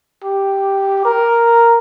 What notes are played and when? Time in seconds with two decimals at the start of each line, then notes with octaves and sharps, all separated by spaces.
0.24 G4
1.05 A#4